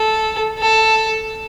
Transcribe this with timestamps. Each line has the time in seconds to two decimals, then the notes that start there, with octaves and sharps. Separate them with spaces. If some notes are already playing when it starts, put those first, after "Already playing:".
Already playing: A4
0.59 A4